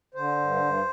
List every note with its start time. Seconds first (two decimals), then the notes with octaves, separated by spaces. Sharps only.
0.15 D3 C5
0.38 G2
0.62 G2